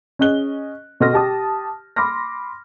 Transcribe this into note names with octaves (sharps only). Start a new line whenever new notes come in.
C#4 G#4 D#5 F#6 G7
B2 A4 D#5 C6 F6 A#6
G4 A5 D#6
B5 C6 D6 F6 A#6